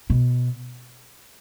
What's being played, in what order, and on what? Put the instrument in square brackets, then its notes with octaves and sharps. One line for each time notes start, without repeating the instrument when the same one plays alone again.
[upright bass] B2